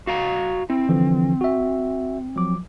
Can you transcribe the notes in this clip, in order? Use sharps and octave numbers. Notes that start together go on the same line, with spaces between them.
F#4 F5 A#5
C4 E4
D3 E3 F3
F#4 E5
F3 F#3 D6